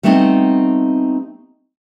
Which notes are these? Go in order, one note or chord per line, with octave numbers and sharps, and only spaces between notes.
G3 A3 B3 C4 D4 D#4